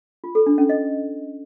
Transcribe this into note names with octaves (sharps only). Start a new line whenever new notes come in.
F4
A4
D4
C#4
D#5